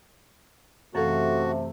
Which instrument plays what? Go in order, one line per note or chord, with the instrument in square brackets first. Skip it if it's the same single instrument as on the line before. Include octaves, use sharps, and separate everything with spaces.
[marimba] F#2 E3 [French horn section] C3 A3 [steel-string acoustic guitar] C#4 A4 F5 [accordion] F#4